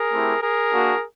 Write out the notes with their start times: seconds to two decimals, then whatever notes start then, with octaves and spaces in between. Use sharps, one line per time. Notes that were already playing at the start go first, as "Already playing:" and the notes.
Already playing: G#4 A#4
0.13 A3 C4 E4 G4
0.42 G#4 A#4
0.72 A#3 D4 F#4